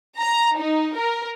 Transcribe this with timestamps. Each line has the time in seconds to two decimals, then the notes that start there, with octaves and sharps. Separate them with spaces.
0.19 A#5
0.57 D#4
0.96 A#4